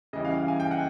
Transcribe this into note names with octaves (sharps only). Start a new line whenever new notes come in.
C#3 E3 G3 D#5
F5
G#5
G5
F#5